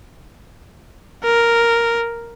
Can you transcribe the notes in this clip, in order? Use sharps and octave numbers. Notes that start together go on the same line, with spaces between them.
A#4